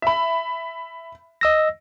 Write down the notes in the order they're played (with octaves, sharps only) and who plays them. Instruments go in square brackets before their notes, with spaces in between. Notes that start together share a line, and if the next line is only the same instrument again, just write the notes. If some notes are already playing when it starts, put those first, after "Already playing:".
[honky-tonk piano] E5 B5
[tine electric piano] D#5 E6 A#6